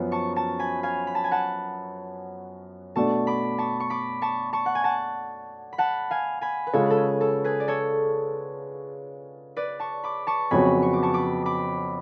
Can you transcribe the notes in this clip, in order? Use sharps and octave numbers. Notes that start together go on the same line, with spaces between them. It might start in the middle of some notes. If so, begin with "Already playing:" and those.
Already playing: F#2 F3 B3
A5 C#6
A5 C#6
G#5 B5
F5 G#5
B5
A5
G#5
F#5 A5
B2 A3 D4 A5 C#6
B5 D6
A5 C#6
C#6
B5 D6
A5 C#6
A5 C#6
F#5
G#5
F#5 A5
B5
F#5 A5
F5 G#5
G#5 B5
B4
C#3 G#3 C#4 F4 A4 C#5
A4
G#4
A4
G#4 B4
D5
A4 C#5
B4 D5
A5 C#6
B5 D6
A5 C#6
F2 C#3 F#3 B3 F#4 G#5 B5
C#6
D6
A5 C#6
B5 D6
B5 D6